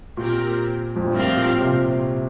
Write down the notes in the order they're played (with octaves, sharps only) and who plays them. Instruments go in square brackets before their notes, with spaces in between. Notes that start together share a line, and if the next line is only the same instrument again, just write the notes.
[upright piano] A#2 [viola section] C4 G4 A#4
[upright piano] F2
G2
[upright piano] A2 [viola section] F3 C4 G4 A#4 F5
[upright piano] A#2
A#2
C3